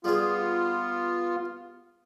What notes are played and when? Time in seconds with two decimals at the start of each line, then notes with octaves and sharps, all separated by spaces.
0.04 G3 B3 F4 G#4